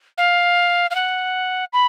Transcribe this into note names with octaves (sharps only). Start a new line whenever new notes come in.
F5
F5
F#5
B5